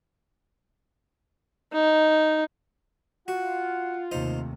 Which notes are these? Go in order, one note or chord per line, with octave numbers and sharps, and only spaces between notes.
D#4
F4 F#4 F#5
D#2 C3 A3 D#4 C5